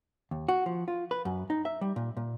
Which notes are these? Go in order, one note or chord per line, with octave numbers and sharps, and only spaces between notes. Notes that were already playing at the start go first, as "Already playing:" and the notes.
D#2
F#4
F3
F4
B4
F#2
D#4
E5
G3
A#2
A#2